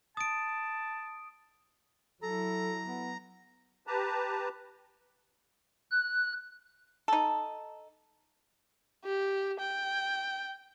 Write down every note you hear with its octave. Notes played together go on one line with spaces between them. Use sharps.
A5 D#6 D7
F#3 E4 A4 A#5
B3
G4 B4 A5 A#5
F#6
D#4 A4
G4
G5